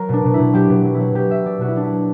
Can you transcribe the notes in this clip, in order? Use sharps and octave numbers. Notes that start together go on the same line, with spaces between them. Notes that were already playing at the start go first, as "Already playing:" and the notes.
Already playing: F#3 A#4
B2 D4
B2
E4
B2
F#3 G4
B2
F#3
E4
F#3
B2 G4
F#3 E5
F#3 D5
B2 F#4
E4
F#3 D4
E4
F#3